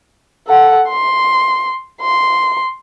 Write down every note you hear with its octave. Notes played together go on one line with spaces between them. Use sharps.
A4 F#5
C6
C6